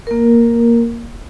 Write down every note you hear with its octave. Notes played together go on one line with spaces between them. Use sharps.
A#3 A#4